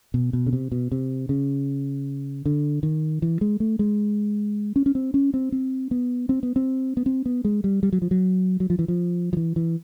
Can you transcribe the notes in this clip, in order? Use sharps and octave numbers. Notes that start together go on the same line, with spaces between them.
B2
B2
C#3
C3
B2
C3
C#3
D3
D#3
E3
G#3
A3
G#3
C#4
C#4
C4
C#4
C4
C4
B3
C4
B3
C4
B3
C4
B3
G#3
G3
G3
F#3
F3
F#3
F#3
F3
E3
F3
F3
E3
E3